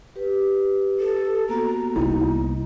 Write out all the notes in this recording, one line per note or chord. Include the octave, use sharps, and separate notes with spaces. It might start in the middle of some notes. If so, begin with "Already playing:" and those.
G4 B4
A4
A#3 B3 F#4 A#5
C2 D#4 E4